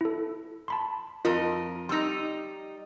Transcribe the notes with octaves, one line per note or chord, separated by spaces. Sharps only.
E4 A4
A5 B5 C6
F2 F4 A#4 D#5
G3 D#4 C6 E6 A#6